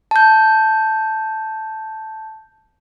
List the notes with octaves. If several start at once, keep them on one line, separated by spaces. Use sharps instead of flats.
A5 G6